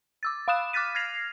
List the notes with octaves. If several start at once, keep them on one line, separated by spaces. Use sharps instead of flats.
D6 E6 A6
F5 B5 D#6 F#6 E7
D6 F6 F#6 A6 B6 D#7
F6 G#6 A#6 C7 F7